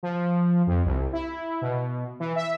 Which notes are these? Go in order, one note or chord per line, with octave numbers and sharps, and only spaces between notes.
F3
F2
C2
E4
B2
E3
E5